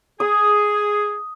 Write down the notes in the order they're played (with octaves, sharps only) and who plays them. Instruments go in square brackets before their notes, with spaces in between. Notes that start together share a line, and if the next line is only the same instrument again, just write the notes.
[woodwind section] G#4 [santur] D#6